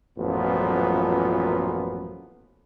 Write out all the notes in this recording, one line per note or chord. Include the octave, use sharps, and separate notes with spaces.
A1 F#2 A#2 F3 F#3 B3